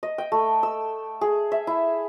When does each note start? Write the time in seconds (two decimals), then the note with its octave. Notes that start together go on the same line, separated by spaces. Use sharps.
0.03 D#5
0.18 G5
0.32 A3
0.63 E6
1.21 G#4
1.52 E5
1.67 E4